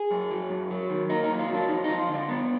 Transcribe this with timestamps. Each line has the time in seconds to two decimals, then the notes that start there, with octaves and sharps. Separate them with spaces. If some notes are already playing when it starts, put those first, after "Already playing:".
Already playing: G#4
0.11 F#2
0.31 F#3
0.50 F#2
0.71 F#3
0.89 D#3
1.10 A#3 D#4
1.24 D#4
1.29 F#2
1.39 F4
1.49 F#3
1.54 D4
1.69 F2 D#4
1.84 D#4
1.89 F3
1.98 F4
2.09 D3
2.14 D4
2.28 B3